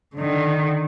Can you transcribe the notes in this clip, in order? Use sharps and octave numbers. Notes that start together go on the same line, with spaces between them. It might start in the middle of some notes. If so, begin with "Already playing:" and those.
D3 D#3